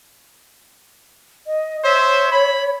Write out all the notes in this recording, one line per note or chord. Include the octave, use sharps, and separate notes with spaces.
D#5
C5 C#5 E5
B5